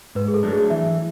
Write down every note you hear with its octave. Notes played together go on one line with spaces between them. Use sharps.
G#2 B4
G#4
A4
F#3 A3 D4
G#4
E3 E5